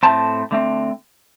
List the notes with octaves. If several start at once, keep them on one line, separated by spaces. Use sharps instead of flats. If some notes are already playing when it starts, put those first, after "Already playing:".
A2 A3 C4 A5
D3 A3 C4